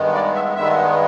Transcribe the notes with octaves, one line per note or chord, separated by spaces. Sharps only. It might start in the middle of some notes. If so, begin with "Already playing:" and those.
Already playing: G2 D#3 G#3 B3
D5
E5
G2 D#3 G#3 B3 E5